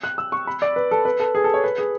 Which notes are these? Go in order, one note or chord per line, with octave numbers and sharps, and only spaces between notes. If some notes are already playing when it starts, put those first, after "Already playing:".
F#6
E6
C#6
B5
D5
B4
A4
B4
A4
G#4
A4
C#5
B4
G#4